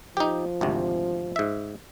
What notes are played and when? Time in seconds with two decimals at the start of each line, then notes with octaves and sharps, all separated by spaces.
0.17 F3 D#4 G4
0.61 G#1 D2 C3
1.36 G#2 E5